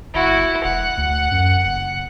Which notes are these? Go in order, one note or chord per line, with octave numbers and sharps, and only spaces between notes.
G1 E4 F#4
E1 F#5
D2
F#2
F#1